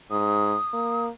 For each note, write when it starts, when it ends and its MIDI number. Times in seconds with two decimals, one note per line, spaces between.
0.11 0.56 44
0.11 1.04 87
0.73 1.09 58